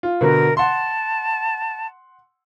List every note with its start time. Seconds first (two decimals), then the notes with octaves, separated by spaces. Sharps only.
0.03 F4
0.21 B2 D3 B3 A#4
0.57 F#5 A5 C6